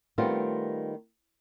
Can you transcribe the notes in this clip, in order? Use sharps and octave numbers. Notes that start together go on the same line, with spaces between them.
D#3 G3 A3 B3 C4 F4